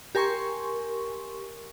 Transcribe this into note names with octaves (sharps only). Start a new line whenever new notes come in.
G4 A#4 G#5 C6 C#6